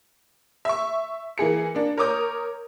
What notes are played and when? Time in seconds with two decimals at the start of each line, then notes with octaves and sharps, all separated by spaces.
0.65 E5 C#6
1.38 E3 A#3 G#4 C#7
1.75 A#3 D4
1.98 A#4 C#5 D6 D#6 G6